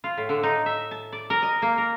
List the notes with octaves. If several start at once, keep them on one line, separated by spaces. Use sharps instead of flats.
F4
A2
D3
D#4
E5
A5
D5
A#4
D#5
A#3
A#4